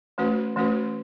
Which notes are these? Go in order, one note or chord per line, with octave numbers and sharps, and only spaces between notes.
E3 A3 C#4 F#4 B4
E3 A3 C#4 F#4 B4